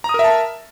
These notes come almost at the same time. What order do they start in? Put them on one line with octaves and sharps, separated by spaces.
A#5 D#6 A#4 E5 A5